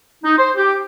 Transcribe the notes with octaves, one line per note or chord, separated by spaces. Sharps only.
D#4
C5
G4